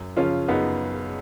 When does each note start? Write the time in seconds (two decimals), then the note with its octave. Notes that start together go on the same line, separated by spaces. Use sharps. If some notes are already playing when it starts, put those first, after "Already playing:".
Already playing: F#2
0.17 C#3 F3 C#4 F4
0.48 F#2 B3 D#4